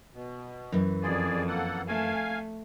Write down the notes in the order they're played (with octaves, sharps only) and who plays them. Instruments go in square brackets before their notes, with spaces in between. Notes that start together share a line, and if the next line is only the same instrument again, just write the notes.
[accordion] B2
[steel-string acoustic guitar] F#2 E3
[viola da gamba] F2 [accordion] G#4 D5
[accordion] A#3 A4 F#5
[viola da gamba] A3 [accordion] F5 G#5